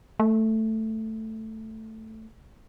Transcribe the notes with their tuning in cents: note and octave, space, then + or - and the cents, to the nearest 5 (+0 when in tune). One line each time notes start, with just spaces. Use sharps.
A3 +5